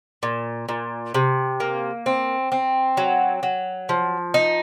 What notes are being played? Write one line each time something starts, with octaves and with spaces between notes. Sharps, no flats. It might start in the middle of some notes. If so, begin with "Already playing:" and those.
A#2
A#2
C3
A#3
C4
C4
F#3
F#3
F3
D#4